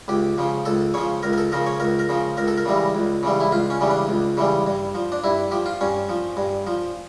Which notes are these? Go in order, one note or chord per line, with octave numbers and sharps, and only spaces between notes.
C#2 G4
C#3 F3
C#2 A4
C#3 F3 C#5
C#2 A#4
A#4
A4
C#3 F3 A#4
C#5
C#2 A#4
A#4
C#3 F3
C#2 A#4
A4
A#4
C#3 E3 G3
C#2
C#3 E3 G3
E4
C#2 F4
C#4
C#3 E3 G3
D4
C#2
C#3 E3 G3
G2
F3
D4
G2 E4
F3 G4
F4
G2 C#4
F3
G2
F3